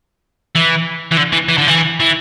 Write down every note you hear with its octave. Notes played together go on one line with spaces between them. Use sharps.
E3
E3
D3
E3
E3
D3
E3
E3